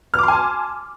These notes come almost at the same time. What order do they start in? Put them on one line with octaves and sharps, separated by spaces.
F6 D6 C6 G#5 A5